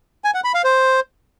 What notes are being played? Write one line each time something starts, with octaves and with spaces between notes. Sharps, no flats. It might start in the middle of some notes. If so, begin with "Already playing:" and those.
G#5
F#5
B5
F5
C5